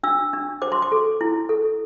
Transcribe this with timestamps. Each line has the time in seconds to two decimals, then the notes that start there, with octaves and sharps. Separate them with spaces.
0.03 D4 E6
0.33 D4
0.62 C5 D6
0.72 C6
0.82 D6
0.92 A4
1.21 E4
1.49 A4